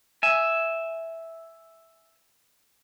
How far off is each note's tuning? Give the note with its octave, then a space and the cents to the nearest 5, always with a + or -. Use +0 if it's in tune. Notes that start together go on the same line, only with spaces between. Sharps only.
E5 +0 G#5 +5